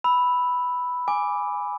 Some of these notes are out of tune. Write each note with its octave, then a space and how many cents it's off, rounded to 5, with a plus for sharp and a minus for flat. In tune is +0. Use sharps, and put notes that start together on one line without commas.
B5 +0 E6 -10
G#5 -5 D6 +0